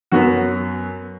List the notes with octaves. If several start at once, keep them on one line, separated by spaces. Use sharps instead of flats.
F#2 F#3 B3 F#4